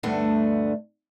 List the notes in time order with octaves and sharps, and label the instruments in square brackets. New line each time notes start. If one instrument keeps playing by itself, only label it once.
[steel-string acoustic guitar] D2 G2 A3 B3 D4